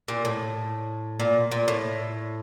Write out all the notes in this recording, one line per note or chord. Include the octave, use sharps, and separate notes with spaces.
A#2
A2
A#2
A#2
A2